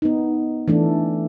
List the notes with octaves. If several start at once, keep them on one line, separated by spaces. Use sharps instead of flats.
B3 D#4
E3 A3 D4